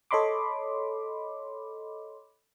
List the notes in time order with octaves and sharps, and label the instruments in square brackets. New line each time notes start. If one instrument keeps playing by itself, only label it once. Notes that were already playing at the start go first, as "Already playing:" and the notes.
[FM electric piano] A4 C#5 D#5 B5 C6 D6